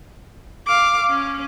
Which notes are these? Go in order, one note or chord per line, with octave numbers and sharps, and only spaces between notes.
F5 D6
C#4